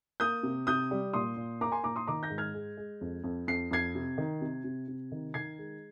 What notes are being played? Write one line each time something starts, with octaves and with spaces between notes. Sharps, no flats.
A#3 D#6 G6
C3
C3 D#6 G6
G3
A#2 C6 D#6
A#2
A#3 A#5 D6
G#5 C6
A#2 A#5 D6
C6 D#6
D#3 A#5 D6
G6 A#6
G#2
F6 G#6
G#3
G#3
F2
F2
F2 C7
F2 G#6 C7
C3
D#3
C3
C3
C3
D#3
D#3 G#6 C7
G#3